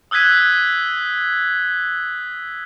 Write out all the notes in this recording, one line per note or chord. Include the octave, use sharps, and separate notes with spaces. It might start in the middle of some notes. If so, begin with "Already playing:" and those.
D#6 E6 F#6 G#6 B6 D#7